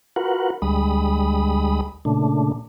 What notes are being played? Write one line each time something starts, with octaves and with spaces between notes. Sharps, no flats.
F4 F#4 A#4 B4 F#5
D2 G3 G#3 B5 D#6
A#2 C#3 A3 D4